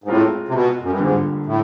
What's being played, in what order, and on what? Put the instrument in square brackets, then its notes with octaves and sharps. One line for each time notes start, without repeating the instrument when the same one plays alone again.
[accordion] G#2
[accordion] A2 [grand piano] G#3 C4 F4 A#4
[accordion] C3
B2
F#2
G2
[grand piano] F2 D3 G3 A#3 D4 [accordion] G#2
[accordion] A2